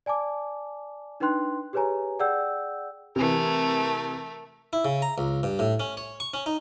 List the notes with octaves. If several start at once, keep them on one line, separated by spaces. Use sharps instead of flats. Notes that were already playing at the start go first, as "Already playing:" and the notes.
D5 G#5 A5 D6
D4 D#4 B4 G5 C6 F#6
G4 G#4 B4 C#5 G#5 A#5
G#4 D5 F#5 G5 E6 G6
C3 E3 A3 A#4
E4
C#3
A#5
C#2
G2
A2
C#4
C#5
C#6
C#4
D#4